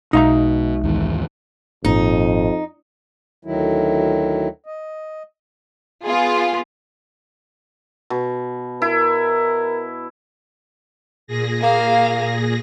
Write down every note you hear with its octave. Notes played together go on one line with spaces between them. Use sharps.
B1 B2 G#3 D#4 E5 F5 A#5
D#2 G#2 E3
G#1 F2 A#2 D#4
D2 D#3 F#3 E4
D#5
B3 F4 G#4
B2
E4 A#4
A#2 G#4 A#6
A#3 F5